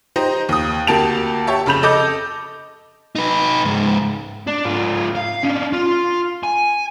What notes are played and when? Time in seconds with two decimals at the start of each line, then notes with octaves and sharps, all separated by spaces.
0.16 D#4 G4 C5 D#5
0.49 D#2 D#6
0.87 D2 A#3 G4 A5 D7 F7
1.47 G4 C#5 E5 A5
1.66 F1 C#3 B5 G6 F7
1.83 A4 D#5 D6 G6
3.16 D#4 B4
3.65 C#2 G#2
4.47 D4
4.65 G#2 F4
5.15 F5
5.43 C#4 D4
5.73 F4
6.43 G#5